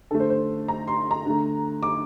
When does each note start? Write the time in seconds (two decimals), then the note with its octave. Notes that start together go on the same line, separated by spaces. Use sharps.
0.11 D3 A3 A4
0.20 C5
0.30 C5
0.68 A#5
0.88 C6
1.11 A#5
1.26 D3 A3
1.83 D6